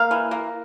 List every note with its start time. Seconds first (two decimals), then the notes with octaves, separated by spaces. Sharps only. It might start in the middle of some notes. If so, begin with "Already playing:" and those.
Already playing: A#3 F5
0.11 E3
0.31 A#3